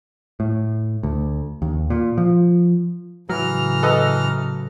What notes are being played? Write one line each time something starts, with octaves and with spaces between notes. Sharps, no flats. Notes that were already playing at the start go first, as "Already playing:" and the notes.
A2
D2
D#2
A#2
F3
A2 C#3 E3 F#3 A#5 F6
A4 B4 D#5